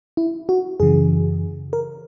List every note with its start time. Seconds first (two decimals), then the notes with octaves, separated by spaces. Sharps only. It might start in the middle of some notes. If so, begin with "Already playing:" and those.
0.17 E4
0.49 F#4
0.80 F#2 C#3 E3 G#4
1.73 A#4